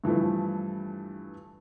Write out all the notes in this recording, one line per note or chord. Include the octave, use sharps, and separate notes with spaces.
G2 E3 F3 A3